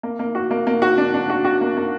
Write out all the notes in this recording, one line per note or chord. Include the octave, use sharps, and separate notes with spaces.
A#3
A#3
F#4
A#3
A#3
F#4
D4
D4
F#4
F#4
A#3
A#3